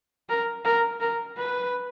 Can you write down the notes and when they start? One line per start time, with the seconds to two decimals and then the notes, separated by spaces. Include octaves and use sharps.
0.29 A#4
0.65 A#4
1.01 A#4
1.37 B4